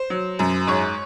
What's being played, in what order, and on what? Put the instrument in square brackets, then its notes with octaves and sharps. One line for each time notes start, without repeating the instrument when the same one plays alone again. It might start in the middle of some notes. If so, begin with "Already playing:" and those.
Already playing: [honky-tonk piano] C5
F#3
F#2
G#2 C#5